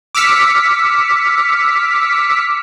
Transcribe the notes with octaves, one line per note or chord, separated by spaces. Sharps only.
D6 E6 F6 B6 C#7